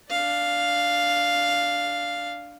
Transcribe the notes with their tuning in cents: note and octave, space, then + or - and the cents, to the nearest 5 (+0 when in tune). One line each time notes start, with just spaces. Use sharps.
D4 +0 F5 +0